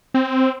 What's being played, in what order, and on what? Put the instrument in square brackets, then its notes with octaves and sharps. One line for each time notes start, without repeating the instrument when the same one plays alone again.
[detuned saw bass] C4